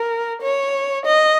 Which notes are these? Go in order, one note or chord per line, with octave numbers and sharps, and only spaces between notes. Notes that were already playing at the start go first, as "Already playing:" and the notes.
Already playing: A#4
C#5
D#5